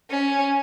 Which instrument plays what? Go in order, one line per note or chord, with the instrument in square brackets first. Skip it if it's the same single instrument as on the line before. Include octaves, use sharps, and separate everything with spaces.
[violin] C#4